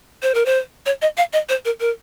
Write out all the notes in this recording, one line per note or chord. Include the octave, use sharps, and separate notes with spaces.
C5
A#4
C5
C#5
D#5
F5
D#5
C5
A#4
A#4